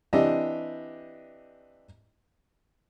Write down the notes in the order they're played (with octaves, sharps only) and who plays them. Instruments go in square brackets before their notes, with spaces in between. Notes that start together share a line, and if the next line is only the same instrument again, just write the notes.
[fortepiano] E3 C4 D4 G4 D#5